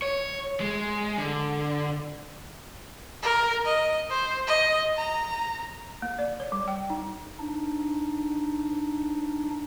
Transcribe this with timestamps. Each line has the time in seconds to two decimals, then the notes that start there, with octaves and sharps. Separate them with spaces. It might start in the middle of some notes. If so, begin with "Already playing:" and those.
0.02 C#5
0.60 G#3
1.18 D3
3.22 A#4
3.65 D#5
4.10 C5
4.47 D#5
4.97 A#5
6.02 A#3
6.19 D5
6.40 C#5
6.52 G3
6.68 G5
6.90 D#4
7.39 D4 D#4